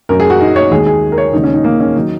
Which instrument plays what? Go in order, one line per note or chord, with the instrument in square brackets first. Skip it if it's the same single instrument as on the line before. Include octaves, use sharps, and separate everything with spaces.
[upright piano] F#2 F#3 A#4
G#4
F#4
D#4
C#5
D#2 D#3 G#3 G#4
G#4
A#4
C#5
D#2 C#3 G#3 D#4
C#4
D#4
A#3
C#4
D#3 F#3 D#4